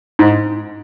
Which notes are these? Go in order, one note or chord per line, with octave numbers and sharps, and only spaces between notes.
G#2